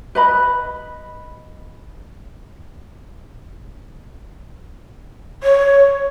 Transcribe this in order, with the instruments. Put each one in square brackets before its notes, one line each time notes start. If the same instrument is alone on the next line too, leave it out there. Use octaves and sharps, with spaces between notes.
[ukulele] B4 D#5 B5
[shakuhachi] C#5